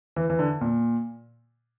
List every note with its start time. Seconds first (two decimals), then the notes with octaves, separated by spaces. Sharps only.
0.16 E3
0.30 E3
0.39 D3
0.61 A#2